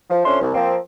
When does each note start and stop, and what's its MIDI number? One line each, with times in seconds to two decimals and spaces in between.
0.10 0.20 53
0.24 0.41 41
0.24 0.41 61
0.24 0.41 62
0.24 0.41 72
0.24 0.41 76
0.24 0.41 84
0.41 0.52 36
0.54 0.76 53
0.54 0.76 58
0.54 0.76 60